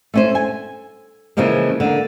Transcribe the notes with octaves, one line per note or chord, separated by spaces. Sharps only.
A3 C#4 C5
G#5
C#3 E3 F3 G#3 A#3
D3 A#3